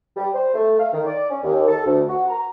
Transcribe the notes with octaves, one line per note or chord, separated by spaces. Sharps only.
G3
C5
A3
F5
D#3
D5
C#4
D#2
A4
D2
F#4
A#5